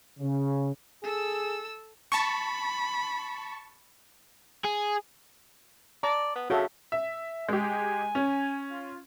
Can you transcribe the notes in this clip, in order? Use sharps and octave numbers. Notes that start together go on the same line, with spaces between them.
C#3
G#4 A4 E6
A5 B5 C#6
G#4
D5 A5 A#5
B3
C#3 F#4 A4 E5
E5
G#3 G4 G#5
C#4
F4